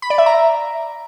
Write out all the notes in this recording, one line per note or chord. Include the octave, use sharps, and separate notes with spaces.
B5
D5
E5
A#5